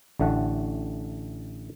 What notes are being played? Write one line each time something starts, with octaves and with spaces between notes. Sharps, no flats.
A1 D3 A3 F#5